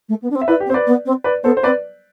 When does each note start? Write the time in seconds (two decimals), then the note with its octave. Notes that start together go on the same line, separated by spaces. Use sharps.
0.09 A3
0.22 B3
0.31 D4
0.35 C4
0.41 E5
0.48 E4 B4 D5
0.60 G4
0.66 C4
0.70 C5
0.74 B4 D5
0.87 B3
1.06 C4
1.24 B4 D5
1.44 B3 A4 C5
1.57 C5
1.63 C4 B4 D5